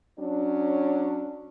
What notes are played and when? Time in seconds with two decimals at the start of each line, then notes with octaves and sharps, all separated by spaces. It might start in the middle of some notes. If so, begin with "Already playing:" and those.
0.19 F#3 C#4 D4